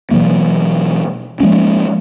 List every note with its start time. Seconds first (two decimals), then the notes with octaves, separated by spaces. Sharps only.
0.11 B2 E3 F#3 A#3
1.40 F3 G#3 A#3 C#4